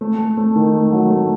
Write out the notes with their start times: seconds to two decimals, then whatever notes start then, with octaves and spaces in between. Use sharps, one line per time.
0.01 A3
0.19 A3
0.37 A3
0.56 D#3
0.74 A3
0.92 F#3
1.10 A3